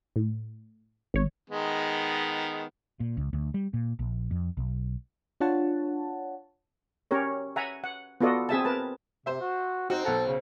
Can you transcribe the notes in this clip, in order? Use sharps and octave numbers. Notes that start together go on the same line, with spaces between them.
A2
G#1 C#5
D#3 G#3 B3
A#2
C#2
D2
G3
A#2
A#1
F2
B1
D4 F4 C#5 F#5 A5
C#4 G4 A#4 C#5
E5 F#5 G#5 A#5
F#5
B3 F4 F#4 A4 D5 D#5
C4 G#4 E5 A5
A#4 B4 A5
C3 C5 E5
F#4
C4 D#4 F#4
B1 A4 F#5 A#5
C#3